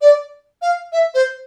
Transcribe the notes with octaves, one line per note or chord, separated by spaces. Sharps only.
D5
F5
E5
C5